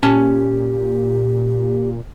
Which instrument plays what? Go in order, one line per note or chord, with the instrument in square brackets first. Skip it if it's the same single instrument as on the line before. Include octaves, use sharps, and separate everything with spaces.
[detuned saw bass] A#2 [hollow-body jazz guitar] C#4 G#5 A5 [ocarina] G4